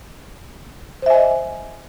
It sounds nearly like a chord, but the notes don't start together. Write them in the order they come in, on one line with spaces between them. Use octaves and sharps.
C5 E5 G#5 D#5